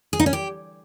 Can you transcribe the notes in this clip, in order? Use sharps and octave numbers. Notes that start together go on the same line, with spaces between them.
G#4
D#4
C#4
G4